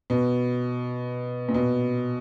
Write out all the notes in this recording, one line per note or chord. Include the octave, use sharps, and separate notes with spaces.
B2
A#2
B2